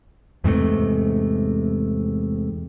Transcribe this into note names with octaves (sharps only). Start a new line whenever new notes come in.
E2 G#2 C3 A3